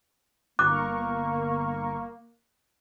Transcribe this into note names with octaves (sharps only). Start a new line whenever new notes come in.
G1 A#3 A#4 C#6 D6 F#6